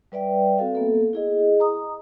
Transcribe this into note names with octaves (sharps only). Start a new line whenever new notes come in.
G3 B4 D5 E5 G5
C4 F#4 A4 F5
A#3 B3 A4
E4 G#4 D#5
A#5 D#6